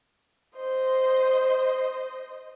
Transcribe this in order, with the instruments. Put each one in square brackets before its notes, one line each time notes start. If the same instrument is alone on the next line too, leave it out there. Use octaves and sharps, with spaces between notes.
[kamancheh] C5 D#5